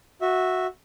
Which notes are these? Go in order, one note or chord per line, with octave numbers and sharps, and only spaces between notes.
F#4 E5